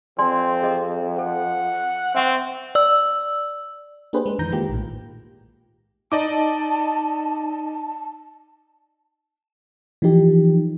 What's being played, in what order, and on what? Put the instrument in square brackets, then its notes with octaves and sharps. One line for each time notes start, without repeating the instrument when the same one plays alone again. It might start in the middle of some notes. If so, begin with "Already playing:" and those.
[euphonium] F2 [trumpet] C4 [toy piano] D5 G#5 C6
[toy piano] G#4 A4 D#5
[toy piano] A4 [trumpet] F#5
[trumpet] C4 [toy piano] E5 F#5 C#6
[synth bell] D5 E6
[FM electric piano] A#3 D4 G4 G#4 B4 C5
G#3 B4
F2 D#3 E3 A#5 G6 A#6
D#3 G#3 A#3 F4 G4
A#1 A2
[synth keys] D#4 [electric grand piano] D5 D#5 D6 [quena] A5
[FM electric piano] E3 F3 D#4 G4